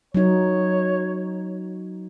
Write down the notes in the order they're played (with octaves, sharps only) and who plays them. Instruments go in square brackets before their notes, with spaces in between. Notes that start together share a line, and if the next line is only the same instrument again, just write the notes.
[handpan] F#3 D#4 [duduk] C#5